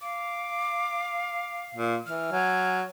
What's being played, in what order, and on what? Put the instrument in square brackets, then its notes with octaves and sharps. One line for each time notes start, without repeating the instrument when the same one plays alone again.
[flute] F5 [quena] D6
[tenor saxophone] A#2
[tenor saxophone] E3 [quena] F6
[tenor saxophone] F#3 [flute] G#5